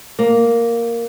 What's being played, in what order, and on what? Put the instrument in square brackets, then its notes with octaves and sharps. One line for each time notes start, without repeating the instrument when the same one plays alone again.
[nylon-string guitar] A#3